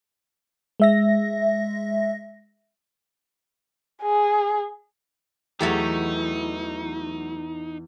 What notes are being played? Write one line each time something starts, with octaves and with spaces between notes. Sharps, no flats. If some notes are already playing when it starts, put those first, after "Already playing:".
G#3 E5 A#6
G#4
E2 E3 F#3 A3 D#4 G4